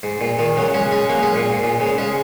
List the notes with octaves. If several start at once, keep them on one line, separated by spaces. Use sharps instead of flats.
G#2
A#2
A#2 D#3
C#3 F#3
G#3 C#4
G#3 C#4
F#3 A#3
G#3 C#4
A#2
G#2
A#2
G#2 C#3
G#3 C#4